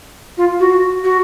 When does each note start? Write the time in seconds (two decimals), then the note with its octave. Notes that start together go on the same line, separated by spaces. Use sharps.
0.37 F4
0.59 F#4
1.03 F#4